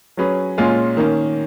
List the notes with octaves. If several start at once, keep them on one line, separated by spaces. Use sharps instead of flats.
F#3 C#4 G#4 B4
A#2 G#3 C#4 F4
D#3 A#3 C#4